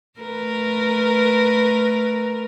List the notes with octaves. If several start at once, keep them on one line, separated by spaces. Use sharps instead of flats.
A3 A#4 B4